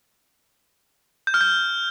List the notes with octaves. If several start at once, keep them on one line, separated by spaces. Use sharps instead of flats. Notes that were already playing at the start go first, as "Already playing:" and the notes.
G6
F6
G6